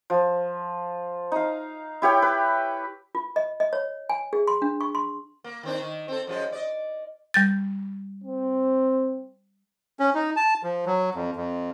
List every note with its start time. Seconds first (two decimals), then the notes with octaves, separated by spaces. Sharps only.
0.10 F3
1.32 D#4 F5
2.02 E4 G4 C#5 G5
2.22 B4
3.15 F4
3.36 D#5
3.60 D#5
3.73 C#5
4.09 G#5
4.33 G#4
4.47 C6
4.62 D4
4.81 C#6
4.95 C6
5.44 A#3
5.63 D#3 C4 D4
5.80 D#3
6.08 C4 A4
6.27 F#2 F3 G#3
6.52 D5 D#5
7.34 G3 G6 A6
8.24 C4
10.00 C#4
10.15 D#4
10.36 A5
10.63 F3
10.87 F#3
11.15 F2
11.37 F2